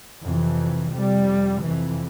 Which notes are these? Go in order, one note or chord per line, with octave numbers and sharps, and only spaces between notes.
F2 C3 E3
F2 C3 G3
F2 C3 E3